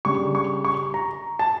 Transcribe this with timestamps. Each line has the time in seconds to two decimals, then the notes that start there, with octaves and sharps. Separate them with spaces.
0.05 C#3 G3 D4 C#6
0.35 C#6
0.65 C#6
0.94 A#5
1.39 A5